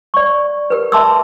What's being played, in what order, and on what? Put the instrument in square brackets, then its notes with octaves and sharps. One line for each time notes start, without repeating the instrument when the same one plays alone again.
[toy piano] D5 C#6
G4 A#4 B4
E5 A5 C6 D6 E6